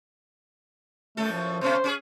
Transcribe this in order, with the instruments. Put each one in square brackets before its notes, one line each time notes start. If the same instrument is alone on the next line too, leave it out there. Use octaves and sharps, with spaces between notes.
[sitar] F#2 A2 A4 [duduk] A3
[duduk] F3
[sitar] B2 A3 C#4 [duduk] C5
[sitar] C#4 G4 G#4